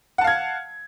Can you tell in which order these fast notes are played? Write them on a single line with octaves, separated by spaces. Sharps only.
F#5 A5 F5 G#6